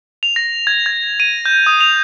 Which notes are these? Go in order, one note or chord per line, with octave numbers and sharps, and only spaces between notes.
F7
A#6
G#6
G#6
D#7
G6
D#6
F7